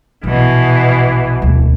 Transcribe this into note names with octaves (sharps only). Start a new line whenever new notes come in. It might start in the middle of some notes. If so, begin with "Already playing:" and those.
A#1 B2 E3
E1 D2